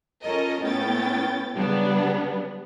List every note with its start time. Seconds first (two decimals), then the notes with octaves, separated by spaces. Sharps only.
0.22 C#4 F4 A4 A#4 D#5
0.61 A2 B3 C#4 G5 A6
1.56 C#3 F#3 G3 B3 D4